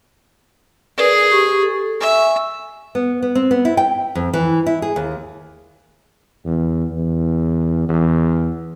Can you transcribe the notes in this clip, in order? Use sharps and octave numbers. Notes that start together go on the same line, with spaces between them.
G#4 A#4 B4 D5
G4 C#6
A4
E5 G#5 C#6
B3
B3
C4
B3
E4
G5
F2
E3
E4
G#4
D#2
E2
E2
E2